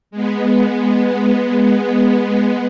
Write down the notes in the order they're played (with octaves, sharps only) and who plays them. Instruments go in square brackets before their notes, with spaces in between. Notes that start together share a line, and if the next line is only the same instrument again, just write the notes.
[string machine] G#3 B3